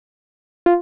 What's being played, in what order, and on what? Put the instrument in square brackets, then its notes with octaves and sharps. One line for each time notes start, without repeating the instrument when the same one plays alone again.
[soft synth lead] F4